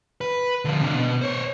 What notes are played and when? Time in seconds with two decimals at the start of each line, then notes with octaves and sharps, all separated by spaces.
0.21 B4
0.65 D3 F3
0.81 C3 D4
0.95 B2
1.21 C5 C#5